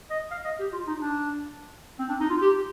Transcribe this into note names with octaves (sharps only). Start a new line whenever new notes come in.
D#5
F5
D#5
G4
F4
D#4
D4
C4
D4
D#4
F4
G4